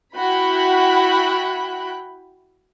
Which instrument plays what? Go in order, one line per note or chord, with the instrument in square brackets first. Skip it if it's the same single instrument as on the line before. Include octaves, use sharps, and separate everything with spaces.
[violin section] E4 F#4 G5 B5 F#6